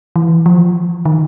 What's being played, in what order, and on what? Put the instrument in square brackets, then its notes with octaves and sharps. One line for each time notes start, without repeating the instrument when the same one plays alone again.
[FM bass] E3
F3
D#3